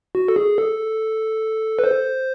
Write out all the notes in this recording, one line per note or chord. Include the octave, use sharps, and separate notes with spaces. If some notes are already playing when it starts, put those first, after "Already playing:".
F#4
A4
G#4
A4
B4
C5